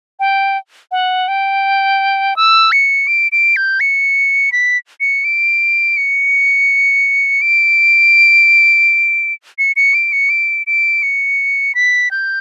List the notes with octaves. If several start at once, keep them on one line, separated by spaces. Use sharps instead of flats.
G5
F#5
G5
E6
C#7
D7
D7
G6
C#7
B6
C#7
D7
C#7
D7
C#7
C#7
D7
C#7
D7
D7
C#7
B6
G6